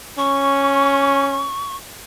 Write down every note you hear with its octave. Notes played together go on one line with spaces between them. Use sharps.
C#4 C#6